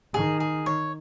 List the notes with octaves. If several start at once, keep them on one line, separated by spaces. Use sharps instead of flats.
D#3 G#4
G#4
C#5